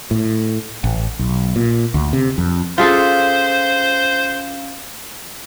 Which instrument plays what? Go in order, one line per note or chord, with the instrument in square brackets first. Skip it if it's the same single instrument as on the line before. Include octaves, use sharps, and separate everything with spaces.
[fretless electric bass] A2
A1
B1
A#2
D2
C3
F2
[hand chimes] C#4 F5 [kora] F4 G#4 A4 [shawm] C5